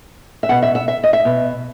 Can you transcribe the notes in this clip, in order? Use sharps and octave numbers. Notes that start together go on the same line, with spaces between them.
E5
B2 F#5
E5
E5
E5
D#5
E5
B2